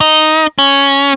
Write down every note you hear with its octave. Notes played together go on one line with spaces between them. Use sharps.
D#4
C#4